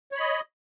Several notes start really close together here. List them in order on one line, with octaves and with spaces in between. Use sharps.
C#5 B5 D#5